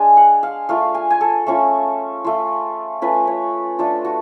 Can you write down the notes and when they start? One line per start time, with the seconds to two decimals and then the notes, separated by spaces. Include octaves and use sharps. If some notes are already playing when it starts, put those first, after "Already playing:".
Already playing: G#3 D4 G#5
0.17 F#5
0.43 F5
0.69 A3 F4 F5
0.95 G#5
1.10 G#5
1.21 A4
1.47 A3 C#4 F4
2.24 A3 F4
3.02 A3 C#4 F4 B4
3.27 C#5
3.79 A3 D4 F4 A4
4.05 F#4